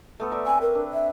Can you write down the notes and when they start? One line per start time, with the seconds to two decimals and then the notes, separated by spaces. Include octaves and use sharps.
0.20 A3 B3 A4
0.31 D5 E5 A#5
0.46 C4 B4 G#5 C#6
0.61 A#4
0.75 D4
0.93 E5